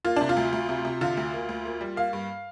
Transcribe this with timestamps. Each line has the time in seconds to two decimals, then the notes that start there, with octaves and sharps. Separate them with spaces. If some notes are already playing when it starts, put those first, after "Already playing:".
0.05 A#3 F4
0.16 C3 D4
0.29 F4
0.37 D2
0.53 D2
0.69 C3
0.85 C3
1.01 D3 F4
1.17 D2
1.33 A#3
1.49 D2
1.65 A#3
1.81 G3
1.96 A#3 F5
2.13 G2